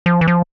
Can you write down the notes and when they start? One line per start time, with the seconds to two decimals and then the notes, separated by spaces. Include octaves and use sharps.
0.06 F3
0.21 E3
0.28 F3